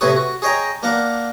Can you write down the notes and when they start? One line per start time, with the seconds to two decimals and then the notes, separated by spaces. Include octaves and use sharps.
0.01 A2 C3 E4 B4 C#5 D#6
0.16 F#4
0.42 G#4 C#5 D#5 G5 A#5
0.83 A#3 D4 A#4 F#5